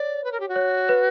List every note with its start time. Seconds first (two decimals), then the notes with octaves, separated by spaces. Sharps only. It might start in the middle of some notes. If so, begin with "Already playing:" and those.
Already playing: C#5 D5
0.24 B4
0.32 A#4
0.40 G4
0.48 F#4
0.56 C#5
0.89 B4